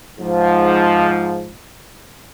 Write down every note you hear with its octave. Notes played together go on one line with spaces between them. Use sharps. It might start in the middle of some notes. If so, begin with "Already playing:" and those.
G#2 F3